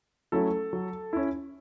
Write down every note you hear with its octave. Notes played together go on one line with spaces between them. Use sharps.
F#3 A3 C#4 E4 A4
F#3
C#4 E4